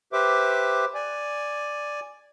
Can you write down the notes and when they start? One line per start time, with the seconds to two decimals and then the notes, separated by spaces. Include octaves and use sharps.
0.13 G4 B4 C5 E5 D6
0.95 D5 G#5